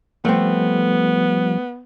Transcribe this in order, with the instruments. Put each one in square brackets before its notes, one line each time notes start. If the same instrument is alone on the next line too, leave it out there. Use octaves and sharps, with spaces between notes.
[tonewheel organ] F3 G3 [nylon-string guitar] A3 C4 [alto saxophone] B3